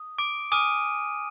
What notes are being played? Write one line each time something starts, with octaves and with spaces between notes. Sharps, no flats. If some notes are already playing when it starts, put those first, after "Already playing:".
Already playing: D#6
D6 D7
G#5 D6 D#6 F6 D#7